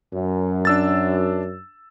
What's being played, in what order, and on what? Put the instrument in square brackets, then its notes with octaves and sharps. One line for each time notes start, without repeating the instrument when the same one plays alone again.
[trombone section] F#2
[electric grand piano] D4 E6 A6